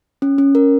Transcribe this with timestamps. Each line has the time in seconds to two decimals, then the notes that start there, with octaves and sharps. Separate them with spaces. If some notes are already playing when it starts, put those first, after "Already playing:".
0.22 C#4
0.38 C#4
0.55 A#4